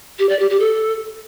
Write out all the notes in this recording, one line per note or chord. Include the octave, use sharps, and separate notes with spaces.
G4
D5
G4
G4
A4